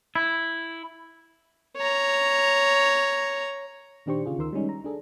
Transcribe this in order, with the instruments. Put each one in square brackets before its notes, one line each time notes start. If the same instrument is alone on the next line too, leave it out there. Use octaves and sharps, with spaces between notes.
[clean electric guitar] E4
[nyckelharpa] C#5 A#5
[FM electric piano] A#2 D#3 D4 G4 C5 C#6
C#3 F4 G#4
D2 D#3 A#4 C6 E6
G3 G#3 C#4 D#4
A#5
D4 G#4 A4